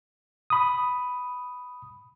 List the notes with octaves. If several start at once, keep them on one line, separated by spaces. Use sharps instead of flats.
B5 D#6